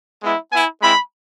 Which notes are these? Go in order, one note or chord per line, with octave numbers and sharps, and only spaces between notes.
G#3 B3 E4
B3 E4 G#5
G#3 C4 E4 B5